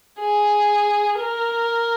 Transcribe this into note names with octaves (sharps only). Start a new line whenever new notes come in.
G#4
A#4